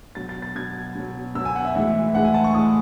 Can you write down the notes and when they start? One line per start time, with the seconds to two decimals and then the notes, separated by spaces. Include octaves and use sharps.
0.15 B2 F#3 A6
0.29 A6
0.42 A6
0.55 B2 F#3 G#6
0.95 B2 F#3
1.35 B2 F#3 E6
1.45 G#5
1.55 F#5
1.65 E5
1.75 A2 E3 G#3 E5
2.15 A2 E3 G#3 F#5
2.25 G#5
2.34 A5
2.44 C#6
2.54 A2 E3 G#3 D#6